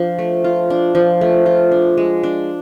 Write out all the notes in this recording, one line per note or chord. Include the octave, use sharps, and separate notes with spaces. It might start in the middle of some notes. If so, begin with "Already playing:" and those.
Already playing: F3 D4 F4
A3
F4
D4
F3
A3
F4
D4
G#3
D4